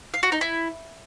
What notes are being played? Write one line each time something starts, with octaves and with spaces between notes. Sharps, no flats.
F5
F#4
D#4
E4